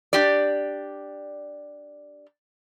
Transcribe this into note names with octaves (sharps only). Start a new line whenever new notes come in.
D4 G4 D5